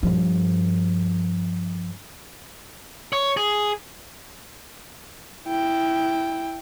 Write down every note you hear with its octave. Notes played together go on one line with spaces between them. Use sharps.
G2 F3
C#5
G#4
E4 G5